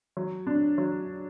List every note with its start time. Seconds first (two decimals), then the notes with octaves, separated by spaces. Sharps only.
0.17 F#3
0.47 D4
0.78 F#3